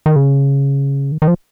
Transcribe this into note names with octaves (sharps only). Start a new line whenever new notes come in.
D#3
C#3
D#3
D#3
F3